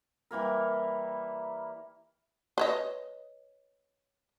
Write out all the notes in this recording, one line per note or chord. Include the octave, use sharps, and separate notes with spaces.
E3 G3 A#3 A#4
B4 C#5 D#5